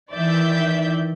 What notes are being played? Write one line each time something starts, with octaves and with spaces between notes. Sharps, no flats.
D#3 E3 D5 E5 G6